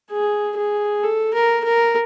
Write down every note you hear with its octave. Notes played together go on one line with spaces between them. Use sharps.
G#4
G#4
A4
A#4
A#4